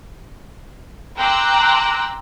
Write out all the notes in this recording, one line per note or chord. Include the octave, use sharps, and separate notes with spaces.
G5 A#5 C6 D6 E6 F#6